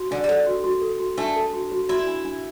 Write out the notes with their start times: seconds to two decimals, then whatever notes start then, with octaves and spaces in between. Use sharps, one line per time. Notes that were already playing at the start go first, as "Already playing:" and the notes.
Already playing: F#4
0.11 D3 D4
0.24 G3
0.29 F#3 A4
0.46 F#4
0.64 F#4
0.82 A4
1.00 F#4
1.18 A3 D4
1.36 A4
1.53 F#4
1.71 F#4
1.89 E4 F#4
2.07 D4
2.25 D4